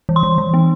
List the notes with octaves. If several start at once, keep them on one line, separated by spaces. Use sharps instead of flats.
E3
C6
E3
E3
B3